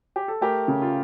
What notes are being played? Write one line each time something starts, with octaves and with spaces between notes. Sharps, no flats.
G4
A4
A3 G4 A#4
C#3
F4